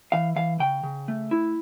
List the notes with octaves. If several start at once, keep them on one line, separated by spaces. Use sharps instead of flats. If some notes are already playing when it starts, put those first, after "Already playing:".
E3 F5
E3 F5
C#3 G5
C#3
A3
E4